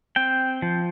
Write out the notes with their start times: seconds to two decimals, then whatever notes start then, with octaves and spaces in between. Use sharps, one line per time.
0.16 C4 G5
0.62 F3